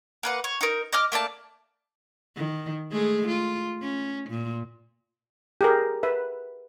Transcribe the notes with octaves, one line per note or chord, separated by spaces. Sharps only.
A#3 B4 F#5
C#5
D#4 A#4
D#5 D6 F6
A3 A#3 D5 A5
D#3
G#3 A3 G#4
F4
C#4
A#2
G4 G#4 A#4
B4 E5